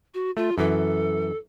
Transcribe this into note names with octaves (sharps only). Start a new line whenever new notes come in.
F#4
A3 F4
F#2 E3 A4